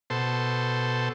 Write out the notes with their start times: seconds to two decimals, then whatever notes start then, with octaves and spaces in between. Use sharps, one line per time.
0.10 B2 A4 C5